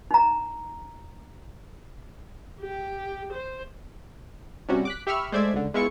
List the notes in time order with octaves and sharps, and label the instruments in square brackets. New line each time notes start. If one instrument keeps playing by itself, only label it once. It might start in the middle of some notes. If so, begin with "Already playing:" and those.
[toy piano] D#4 A#5
[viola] G4
C5
[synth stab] C3 G3 C#4 F#4
D6 F#6 B6
G4 E5 B5 C#6 E6 F6
G#3 A3 C5 D5 E5 G#6
C#2 D3
G#3 B3 E4 F4 C#6 C#7